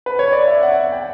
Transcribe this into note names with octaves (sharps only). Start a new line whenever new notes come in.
B4
C#5
D5
E5
F#5
G5